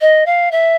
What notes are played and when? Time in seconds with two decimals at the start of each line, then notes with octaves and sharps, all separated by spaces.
0.01 D#5
0.26 F5
0.52 E5